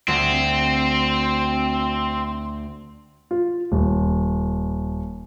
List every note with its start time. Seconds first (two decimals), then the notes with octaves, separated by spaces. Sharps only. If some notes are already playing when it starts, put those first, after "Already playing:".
0.08 D2 C4
3.31 F4
3.72 D#1